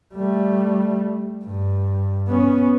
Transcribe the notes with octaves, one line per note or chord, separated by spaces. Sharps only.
G3 A3
G2
B3 C#4